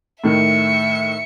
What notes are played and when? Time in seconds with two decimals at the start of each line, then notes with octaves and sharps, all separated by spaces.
0.24 A2 D#3 E5 C#7